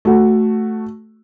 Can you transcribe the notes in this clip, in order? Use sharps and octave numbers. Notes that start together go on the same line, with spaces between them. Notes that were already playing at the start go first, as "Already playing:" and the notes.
A3 F#4